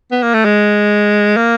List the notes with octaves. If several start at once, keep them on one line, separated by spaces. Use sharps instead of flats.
B3
A#3
A3
G#3
A#3